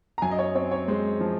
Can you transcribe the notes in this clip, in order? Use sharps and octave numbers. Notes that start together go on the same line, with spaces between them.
A#5
F#2 G#5
D#5
C#5
C4 C#5
C#5
G#3 C5
F3